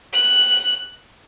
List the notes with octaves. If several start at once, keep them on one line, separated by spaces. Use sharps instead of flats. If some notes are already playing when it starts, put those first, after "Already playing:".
F#6